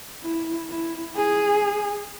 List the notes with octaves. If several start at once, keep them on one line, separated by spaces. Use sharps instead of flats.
E4
E4
G#4